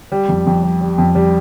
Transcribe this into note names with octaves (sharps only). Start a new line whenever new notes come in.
G3
F2
F2
G3
G3
F2
G3